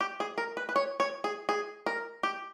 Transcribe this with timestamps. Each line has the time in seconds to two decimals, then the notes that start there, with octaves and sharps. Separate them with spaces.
0.01 G4
0.20 G#4
0.38 A#4
0.57 B4
0.69 B4
0.76 C#5
1.00 C#5
1.24 G#4
1.49 G#4
1.86 A#4
2.23 G4